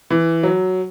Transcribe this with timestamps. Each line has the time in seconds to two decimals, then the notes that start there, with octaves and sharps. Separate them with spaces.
0.10 E3
0.43 F#3